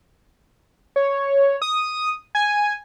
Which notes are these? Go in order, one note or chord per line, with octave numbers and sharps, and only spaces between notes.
C#5
D#6
G#5